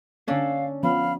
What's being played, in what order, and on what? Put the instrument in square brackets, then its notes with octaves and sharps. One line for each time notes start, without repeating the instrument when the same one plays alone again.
[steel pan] D3 A4 [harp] C#4 D4 [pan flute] F5
[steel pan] F3 B3 C#4 [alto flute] F5 [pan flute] B5